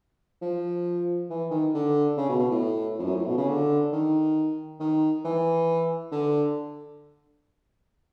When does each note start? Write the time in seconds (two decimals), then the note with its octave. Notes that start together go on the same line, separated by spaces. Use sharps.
0.42 F3
1.30 E3
1.51 D#3
1.74 D3
2.17 C#3
2.29 B2
2.39 B2
2.51 A2
2.99 F2
3.05 F#2
3.15 A2
3.27 B2
3.38 C#3
3.49 D3
3.93 D#3
4.80 D#3
5.25 E3
6.12 D3